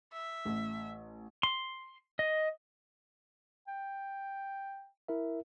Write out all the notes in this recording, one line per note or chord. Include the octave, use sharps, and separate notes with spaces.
E5
A1
C6
D#5
G5
E4 A#4 E5